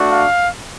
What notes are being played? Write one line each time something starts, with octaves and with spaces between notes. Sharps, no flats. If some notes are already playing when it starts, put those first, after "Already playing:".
Already playing: A3 D4 F#4
F5